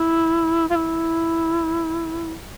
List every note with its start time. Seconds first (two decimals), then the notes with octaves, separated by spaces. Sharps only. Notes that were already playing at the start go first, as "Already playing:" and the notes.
Already playing: E4
0.70 F4
0.75 E4